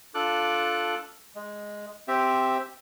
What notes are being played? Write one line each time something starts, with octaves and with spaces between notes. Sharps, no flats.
D4 F4 A4 D6 F#6
G#3
C4 G4 E5